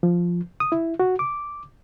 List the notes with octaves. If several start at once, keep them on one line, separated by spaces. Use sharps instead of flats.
F3
D#6
E4
F#4
D6